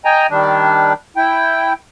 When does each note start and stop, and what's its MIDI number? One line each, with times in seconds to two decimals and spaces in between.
0.05 0.27 75
0.05 0.27 79
0.05 0.27 80
0.05 0.27 82
0.30 0.93 51
0.30 0.93 55
0.30 0.93 62
1.17 1.73 64
1.17 1.73 79